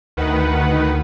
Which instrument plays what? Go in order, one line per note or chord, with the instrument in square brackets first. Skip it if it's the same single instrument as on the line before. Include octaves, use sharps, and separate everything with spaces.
[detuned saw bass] D2 [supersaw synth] D#3 B4 F#5